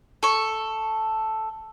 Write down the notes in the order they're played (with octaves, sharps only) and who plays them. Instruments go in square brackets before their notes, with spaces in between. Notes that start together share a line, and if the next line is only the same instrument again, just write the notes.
[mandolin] A4 C#6